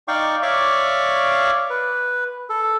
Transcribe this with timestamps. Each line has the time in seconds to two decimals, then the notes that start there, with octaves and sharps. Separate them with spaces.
0.08 D#4 D5 F5 G5 C#6 D6
0.43 C#5 D5 E5 F5 C#6 D6
1.70 B4
2.49 A4